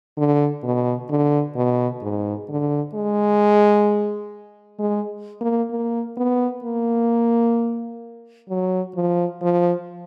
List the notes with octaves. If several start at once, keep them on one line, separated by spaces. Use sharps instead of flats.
D3
B2
D3
B2
G#2
D3
G#3
G#3
A#3
A#3
B3
A#3
F#3
F3
F3